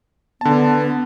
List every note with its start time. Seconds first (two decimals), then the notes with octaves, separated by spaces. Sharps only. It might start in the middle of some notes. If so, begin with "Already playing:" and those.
0.41 D3 B3 A5